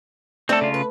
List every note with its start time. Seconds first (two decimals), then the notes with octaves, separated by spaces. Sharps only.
0.49 A3 C4 D4 A4
0.61 C#3 F4
0.74 B4